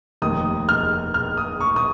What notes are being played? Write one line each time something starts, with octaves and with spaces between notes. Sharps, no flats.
F1 D#2 D#3 D#6
F6
F6
D#6
C#6
D#6